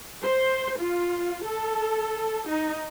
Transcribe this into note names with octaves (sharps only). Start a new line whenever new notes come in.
C5
F4
A4
D#4